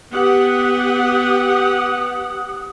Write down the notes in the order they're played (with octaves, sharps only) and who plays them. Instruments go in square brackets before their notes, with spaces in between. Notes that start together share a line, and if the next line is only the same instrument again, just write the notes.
[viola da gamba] B3 [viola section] G4 F#5 [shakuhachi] D#6